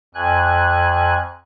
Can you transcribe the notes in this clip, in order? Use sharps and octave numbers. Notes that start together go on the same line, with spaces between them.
F2 G#5 F#6